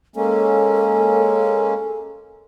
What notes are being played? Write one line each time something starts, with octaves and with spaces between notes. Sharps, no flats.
G#3 A#3 C#4 A4